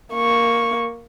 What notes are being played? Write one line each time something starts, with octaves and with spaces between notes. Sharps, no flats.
A#3 C#6